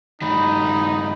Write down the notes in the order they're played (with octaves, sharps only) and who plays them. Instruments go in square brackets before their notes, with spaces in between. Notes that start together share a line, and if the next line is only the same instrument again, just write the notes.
[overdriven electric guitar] G2 D#3 [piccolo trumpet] D#4 [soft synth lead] B5